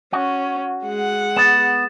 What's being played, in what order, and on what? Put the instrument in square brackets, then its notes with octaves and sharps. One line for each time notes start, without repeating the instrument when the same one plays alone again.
[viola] C#4 [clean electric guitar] F#4
[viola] G#3 F#5
[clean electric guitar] B3 [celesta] A6 E7